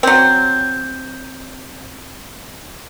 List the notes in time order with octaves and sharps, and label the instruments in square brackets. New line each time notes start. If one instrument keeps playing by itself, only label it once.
[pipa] F#3 C4